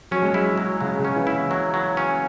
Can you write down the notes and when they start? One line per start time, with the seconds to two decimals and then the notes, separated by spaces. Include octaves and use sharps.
0.11 F#3 C#4
0.22 G#3
0.33 F#3 E4
0.57 F#3
0.81 C#3 F#3
0.99 C#3
1.05 C#4
1.16 E3
1.27 E4
1.51 F#3
1.74 F#3
1.97 C#4